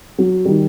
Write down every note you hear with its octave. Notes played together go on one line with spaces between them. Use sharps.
F#3
D#3 G3